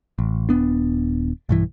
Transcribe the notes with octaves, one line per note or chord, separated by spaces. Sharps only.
A1
D#1 B3 D4
B1 G2 E3